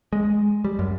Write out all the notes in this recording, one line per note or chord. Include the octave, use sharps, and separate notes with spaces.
G#3
G3
F#2